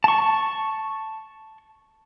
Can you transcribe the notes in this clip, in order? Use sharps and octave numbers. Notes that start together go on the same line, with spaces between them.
A5 C#6